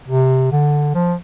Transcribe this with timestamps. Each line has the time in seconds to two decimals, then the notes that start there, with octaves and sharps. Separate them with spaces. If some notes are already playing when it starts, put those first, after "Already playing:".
0.08 C3
0.52 D3
0.95 F3